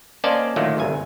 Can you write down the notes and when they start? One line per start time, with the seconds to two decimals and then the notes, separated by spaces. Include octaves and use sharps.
0.24 A#3 C#4 C5 D5 D#5 A5
0.56 A#2 D3 D#3 F#3 A3 A#3
0.78 G1 C2 G#5